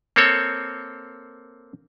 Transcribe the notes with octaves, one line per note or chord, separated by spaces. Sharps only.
A#3 C4 A4 C#5